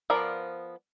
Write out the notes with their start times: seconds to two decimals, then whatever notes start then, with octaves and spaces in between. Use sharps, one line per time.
0.10 F3 B3 A#4 D5 F5